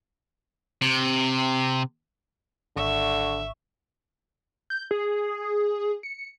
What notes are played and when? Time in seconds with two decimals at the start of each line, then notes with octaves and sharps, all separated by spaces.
0.82 C3
2.77 G#1 D3 E5 C#6
4.70 G6
4.91 G#4
6.03 C#7